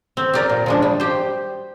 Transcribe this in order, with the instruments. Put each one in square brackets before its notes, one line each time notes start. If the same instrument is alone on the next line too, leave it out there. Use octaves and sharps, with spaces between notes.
[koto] C4
G4 A#4 D5
A#2
F3 G#3 D4
G3
G4 C5